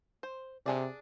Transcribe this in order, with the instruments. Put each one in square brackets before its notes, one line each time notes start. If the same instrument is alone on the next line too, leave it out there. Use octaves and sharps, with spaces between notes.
[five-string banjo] C5
[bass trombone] C3 [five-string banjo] D4 G#4 D5